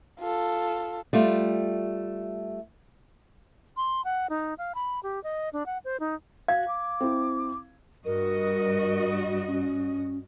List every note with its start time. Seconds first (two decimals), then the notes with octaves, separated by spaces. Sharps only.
0.20 F4 A4
1.13 G3 A3 F4
3.77 C6
4.04 F#5
4.30 D#4
4.58 F5
4.75 B5
5.03 G4
5.23 D#5
5.53 D4
5.66 F#5
5.85 C5
6.00 D#4
6.48 F#4 F5 G#6
6.68 D6
7.01 C4 E4
8.05 G2 F#4 A#4 D#5
9.47 C#4